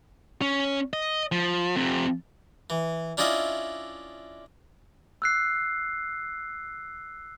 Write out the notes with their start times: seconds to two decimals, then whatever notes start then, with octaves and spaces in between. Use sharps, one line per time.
0.41 C#4
0.93 D#5
1.32 F3
1.75 F2 C3
2.70 E3
3.17 C#4 D4 E4 F4 D#5 E5
5.22 E6 F#6 C7